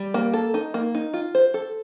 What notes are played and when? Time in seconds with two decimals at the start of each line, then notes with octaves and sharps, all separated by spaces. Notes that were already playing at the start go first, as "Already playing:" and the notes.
Already playing: G3
0.14 A#3
0.33 A4
0.54 D#4
0.74 A#3
0.95 D#4
1.13 F4
1.35 C5
1.54 A4